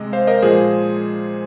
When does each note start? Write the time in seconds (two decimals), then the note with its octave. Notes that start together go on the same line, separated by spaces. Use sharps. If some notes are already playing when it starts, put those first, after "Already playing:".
Already playing: C3 G#3 D#5
0.13 C5 F5
0.27 A#4 D#5
0.42 A#2 F3 G#3 G#4 C5